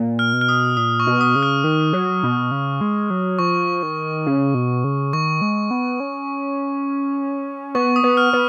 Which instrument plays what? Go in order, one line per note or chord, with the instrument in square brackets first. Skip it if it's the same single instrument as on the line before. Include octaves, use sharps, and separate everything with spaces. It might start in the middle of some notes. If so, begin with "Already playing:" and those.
Already playing: [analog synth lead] A#2
[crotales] F6
[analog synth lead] B2
[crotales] F6
D#6
[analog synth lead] A#2 [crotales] D#6
[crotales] C#6
[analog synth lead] B2
[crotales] D#6
[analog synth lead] C#3
[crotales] F6
[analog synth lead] D#3
F#3
B2
C#3
G#3
F#3
[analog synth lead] F3 [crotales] C#6
[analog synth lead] D#3
C#3
B2
C#3
[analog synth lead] D#3 [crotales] C#6
[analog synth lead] G#3
B3
C#4
[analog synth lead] B3 [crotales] C#6
[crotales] D#6
[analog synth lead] B3
[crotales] F6
[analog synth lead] B3